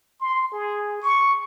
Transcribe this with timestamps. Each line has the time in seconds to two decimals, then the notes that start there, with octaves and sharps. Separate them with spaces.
0.21 C6
0.52 G#4
1.02 C#6